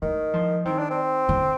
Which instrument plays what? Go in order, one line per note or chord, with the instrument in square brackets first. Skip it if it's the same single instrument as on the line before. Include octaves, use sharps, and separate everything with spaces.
[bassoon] D#3 [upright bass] A3
[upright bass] F3
[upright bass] D#3 [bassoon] C4
[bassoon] D4
C4
[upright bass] D3